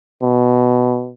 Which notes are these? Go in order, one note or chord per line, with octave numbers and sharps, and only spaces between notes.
B2